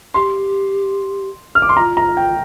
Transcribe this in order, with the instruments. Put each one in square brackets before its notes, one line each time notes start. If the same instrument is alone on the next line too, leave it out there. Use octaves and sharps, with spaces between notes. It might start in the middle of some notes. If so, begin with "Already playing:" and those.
[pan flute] G4 [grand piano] C6
[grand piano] F6
D6
C6
[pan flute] F4 [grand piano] A#5
[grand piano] A#5
G5